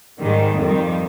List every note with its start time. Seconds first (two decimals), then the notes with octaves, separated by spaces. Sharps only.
0.19 G#2 D#3 G3
0.58 F2 D#3 G3